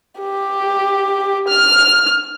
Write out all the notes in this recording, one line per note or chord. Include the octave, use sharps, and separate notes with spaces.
G4
F6